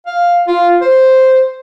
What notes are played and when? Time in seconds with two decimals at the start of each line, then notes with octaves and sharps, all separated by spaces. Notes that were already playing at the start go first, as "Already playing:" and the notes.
0.06 F5
0.47 F4
0.81 C5